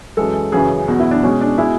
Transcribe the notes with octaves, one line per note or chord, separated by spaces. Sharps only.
F#2 E3 G#3 A4
F#2 C#3 E3 G#4
E2 B2 F#3 F#4
E4
D4
B2 G#3 C#4
D4
B2 G#3 E4